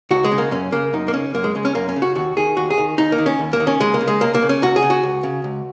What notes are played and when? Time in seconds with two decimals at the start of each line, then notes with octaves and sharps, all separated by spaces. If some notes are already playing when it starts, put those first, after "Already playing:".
0.11 C#2 F#4
0.24 G#3
0.32 C#3
0.38 A#3
0.51 F#2 C#4
0.72 C#3 A#3
0.93 F#2 D#4
1.08 A#3
1.14 C#3 C#4
1.34 F#2 A#3
1.44 G#3
1.55 C#3 G#3
1.65 C#4
1.75 F#2 A#3
1.89 C#4
1.96 C#3
2.02 F#4
2.15 D#2 F#4
2.37 D#3 G#4
2.57 D#2 F#4
2.70 G#4
2.78 D#3
2.98 D#2 D#4
3.12 A#3
3.18 D#3
3.26 C#4
3.39 D#2
3.53 A#3
3.60 D#3
3.67 C#4
3.80 C#2 G#3
3.94 A#3
4.01 C#3
4.08 G#3
4.21 C#2 A#3
4.35 A#3
4.42 C#3
4.49 C#4
4.62 C#2 F#4
4.76 G#4
4.82 C#3
4.90 F#4
5.03 C#2
5.23 C#3
5.44 C#2